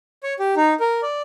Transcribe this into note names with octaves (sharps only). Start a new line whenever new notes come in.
C#5
G4
D#4
A#4
D5